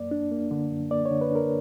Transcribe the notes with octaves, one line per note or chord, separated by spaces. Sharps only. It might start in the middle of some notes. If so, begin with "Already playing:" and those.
Already playing: F#2 A#3 D5
D4
A#3
D3
F#2
A#3 D5
C#5
D3
B4
D4 A#4